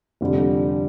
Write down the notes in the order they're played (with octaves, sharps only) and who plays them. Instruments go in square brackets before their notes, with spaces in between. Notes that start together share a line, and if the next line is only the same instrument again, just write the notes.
[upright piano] F1 F2 D3 G3